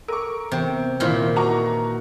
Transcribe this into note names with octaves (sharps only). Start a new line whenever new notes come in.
A4 A#4 C#6
C3 E3 B3 G5
A#2 D#3 E3 E4 F4 C5 F5
F#4 A#5 C#6